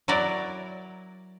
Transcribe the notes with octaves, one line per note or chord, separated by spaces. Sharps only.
F#3 E4 A#4 D5